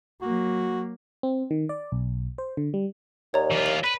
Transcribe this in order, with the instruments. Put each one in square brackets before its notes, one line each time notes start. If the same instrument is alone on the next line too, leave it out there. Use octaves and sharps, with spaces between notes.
[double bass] F#3 A#3 [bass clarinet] F#4
[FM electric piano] C4
D#3
D5
B1
C5
D3
G3
[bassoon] D#2 [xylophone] C#5 D5 A#5
[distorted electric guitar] E3 F4
[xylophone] F#7
[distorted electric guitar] B4 [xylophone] B6 D#7